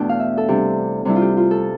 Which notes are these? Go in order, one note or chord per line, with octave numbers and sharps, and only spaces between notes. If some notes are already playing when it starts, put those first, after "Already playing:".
Already playing: E2 B2 A3 D4 G5 A5
F5
E5
A4
C3 G3 D4 G4
C3 G3 D4 E4
F4
G4
F4
A4